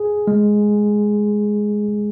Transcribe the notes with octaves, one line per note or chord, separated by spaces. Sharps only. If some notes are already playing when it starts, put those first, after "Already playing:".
Already playing: G#4
G#3